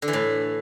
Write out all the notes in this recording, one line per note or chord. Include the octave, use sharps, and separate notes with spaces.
D3
E3
A2